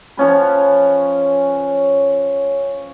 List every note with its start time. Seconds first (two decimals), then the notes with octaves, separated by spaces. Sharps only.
0.17 F3 C#4 B4